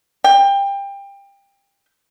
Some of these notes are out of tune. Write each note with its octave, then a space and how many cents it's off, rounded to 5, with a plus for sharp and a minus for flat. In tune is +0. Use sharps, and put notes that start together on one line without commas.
G5 +25